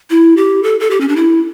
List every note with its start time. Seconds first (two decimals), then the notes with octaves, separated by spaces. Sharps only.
0.10 E4
0.37 G4
0.63 A4
0.80 A4
0.90 G4
1.01 C#4
1.08 D4
1.16 E4